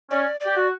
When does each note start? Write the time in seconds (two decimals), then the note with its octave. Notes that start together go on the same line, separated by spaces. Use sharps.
0.10 C#4 D5
0.40 G4 D5
0.56 F#4